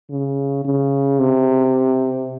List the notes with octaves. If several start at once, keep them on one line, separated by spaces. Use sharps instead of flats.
C#3
C#3
C3